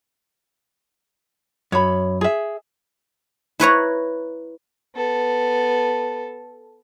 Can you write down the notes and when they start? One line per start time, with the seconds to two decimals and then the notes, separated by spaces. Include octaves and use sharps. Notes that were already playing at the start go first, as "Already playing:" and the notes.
1.72 F#2 C#5 B5
2.21 G#4 E5
3.60 E4 B4 C#5 A#5
4.95 B3 A4